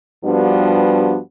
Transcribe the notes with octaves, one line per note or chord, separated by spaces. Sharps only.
G2 F3 G3 B3 D4 F#4